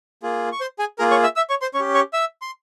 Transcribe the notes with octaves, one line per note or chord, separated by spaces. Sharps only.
A#3 F4 G#4
C#6
C5 C6
G#4 G#5
A#3 F4 G#4 A#4 A#5
C#5 C#6
E5 E6
E5 E6
C#5 C#6
C5 C6
C#4 C#5 C#6
G4
C#5 C#6
E5 E6
C6